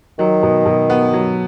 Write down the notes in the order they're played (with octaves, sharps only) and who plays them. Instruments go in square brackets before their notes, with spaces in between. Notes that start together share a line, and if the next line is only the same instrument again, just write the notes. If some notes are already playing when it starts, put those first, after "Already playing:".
[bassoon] D#3 [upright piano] F#3
[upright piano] B2
B2
B3
F#3